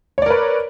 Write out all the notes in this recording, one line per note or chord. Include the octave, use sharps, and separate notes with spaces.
A#4 B4 C#5 D5